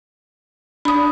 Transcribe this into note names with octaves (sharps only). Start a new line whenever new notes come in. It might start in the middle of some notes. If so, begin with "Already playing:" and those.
D4 B5 D#6